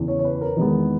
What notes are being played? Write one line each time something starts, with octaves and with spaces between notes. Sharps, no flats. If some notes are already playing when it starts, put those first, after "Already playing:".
Already playing: E2 C#3 E3
C#5
C#5
B4
A#4
E2 D#3 G#3 B3 D#4